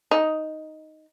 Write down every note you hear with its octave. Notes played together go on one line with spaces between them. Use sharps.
D#4